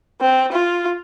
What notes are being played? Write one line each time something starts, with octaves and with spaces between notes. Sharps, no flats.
C4
F4